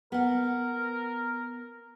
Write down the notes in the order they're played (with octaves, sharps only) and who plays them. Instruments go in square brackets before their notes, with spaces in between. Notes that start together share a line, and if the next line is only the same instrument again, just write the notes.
[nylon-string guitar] B3 F#5 [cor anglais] A#4